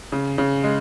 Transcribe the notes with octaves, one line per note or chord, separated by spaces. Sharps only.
C#3
C#3
G#3